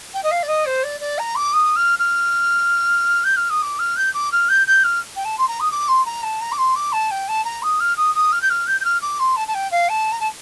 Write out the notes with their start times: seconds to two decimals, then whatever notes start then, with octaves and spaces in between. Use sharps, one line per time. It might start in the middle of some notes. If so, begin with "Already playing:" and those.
0.13 G5
0.23 D#5
0.31 F5
0.42 D5
0.48 D#5
0.65 C5
0.83 D5
1.00 D5
1.18 A#5
1.35 D6
1.53 D#6
1.76 F6
1.99 F6
3.24 G6
3.36 F6
3.50 D#6
3.62 D6
3.79 F6
3.96 G6
4.13 D6
4.32 F6
4.49 G6
4.66 G6
4.83 F6
5.16 G5
5.24 A5
5.38 C6
5.47 A#5
5.60 D#6
5.71 D6
5.88 C6
6.05 A#5
6.22 A5
6.41 A#5
6.52 D6
6.58 C6
6.75 D6
6.92 A5
7.10 G5
7.28 A5
7.44 A#5
7.62 D#6
7.80 F6
7.96 D#6
8.14 D#6
8.32 F6
8.41 G6
8.49 F6
8.66 G6
8.80 G6
8.84 F6
9.01 D6
9.19 C6
9.36 A5
9.47 A5
9.54 G5
9.71 F5
9.88 A5
10.11 A#5
10.19 A5